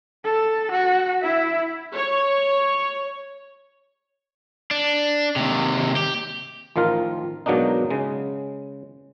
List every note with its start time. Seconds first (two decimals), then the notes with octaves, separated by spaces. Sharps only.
0.24 A4
0.72 F#4
1.21 E4 E5
1.94 C#5
4.71 D4
5.36 D#2 C3
5.96 G4
6.76 A1 D#3 F3 F4 A#4
7.46 G#2 B2 F#3 A#3 D4 D#4
7.90 C#3 G#3